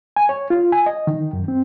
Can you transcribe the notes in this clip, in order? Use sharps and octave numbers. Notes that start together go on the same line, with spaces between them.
G#5
C#5
F4
G#5
D#5
D#3
F#2
C4